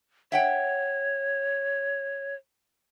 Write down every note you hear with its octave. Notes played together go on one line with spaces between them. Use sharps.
C#5 E5 F#5 G5